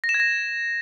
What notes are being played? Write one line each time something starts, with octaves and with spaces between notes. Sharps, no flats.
A#6
E7
G#6
A#6